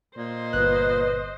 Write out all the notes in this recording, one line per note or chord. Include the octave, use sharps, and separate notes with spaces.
A#2 C5 D#5
G1 B4 F#6